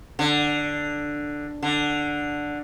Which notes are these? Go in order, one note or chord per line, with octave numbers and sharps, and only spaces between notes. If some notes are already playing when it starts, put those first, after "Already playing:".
D3
D3